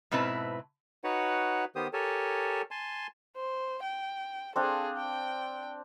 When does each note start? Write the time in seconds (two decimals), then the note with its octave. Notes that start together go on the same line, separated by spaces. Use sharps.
0.11 G#2 B2 C4 E4 B4 A5
1.04 D#4 F#4 B4 C#5 F#5
1.76 D#3 B3 G4 C5 D#6
1.93 G4 A4 A#4 C#5 G#5 A5
2.71 G#5 A5 C6
3.36 C5
3.83 G5
4.56 C4 D4 G#4 A4 F5
4.97 G5